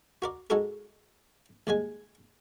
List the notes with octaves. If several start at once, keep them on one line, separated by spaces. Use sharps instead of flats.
F#4 A#4 D5
G#3 D#4 F#4 A4 A#4
D#2 G3 G#3 G#5